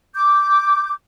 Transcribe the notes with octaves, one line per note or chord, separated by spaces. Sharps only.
D6 G6